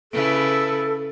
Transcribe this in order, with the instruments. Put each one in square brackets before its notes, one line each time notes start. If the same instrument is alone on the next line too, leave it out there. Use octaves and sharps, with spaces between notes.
[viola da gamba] C#3 E4 B4 [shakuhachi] A4